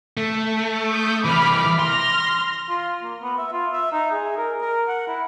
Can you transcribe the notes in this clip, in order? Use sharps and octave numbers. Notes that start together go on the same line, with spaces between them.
A3
D#6 G6
C2 E3 B5 D6 F6
C6 F6 A#6
F4
A#3
B3
E5
F4
E5
D#4
G#4
A#4
A#4
F#5
E4